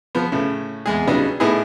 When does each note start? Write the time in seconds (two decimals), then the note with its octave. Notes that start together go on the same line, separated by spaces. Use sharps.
0.15 F3 B3
0.32 A2 C#3
0.86 E2 G#3 G#4
1.07 C#3 F#3 G3 B3 D4 D#4
1.40 A2 B3 D#4 E4 G#4